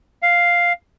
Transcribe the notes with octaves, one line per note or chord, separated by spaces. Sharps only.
F5